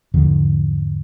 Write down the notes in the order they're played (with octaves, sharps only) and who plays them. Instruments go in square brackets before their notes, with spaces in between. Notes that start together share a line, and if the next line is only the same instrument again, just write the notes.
[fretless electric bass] E2 G#2 D3 F3